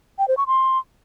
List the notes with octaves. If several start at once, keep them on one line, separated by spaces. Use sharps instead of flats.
G5
C5
C#6
C6